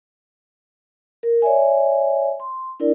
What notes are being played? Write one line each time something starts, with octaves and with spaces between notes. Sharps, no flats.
A#4
C#5 D5 E5 G#5
C6
D4 E4 A#4 D5